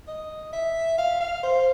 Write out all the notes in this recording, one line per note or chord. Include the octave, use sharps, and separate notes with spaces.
D#5
E5
F5
F5
C5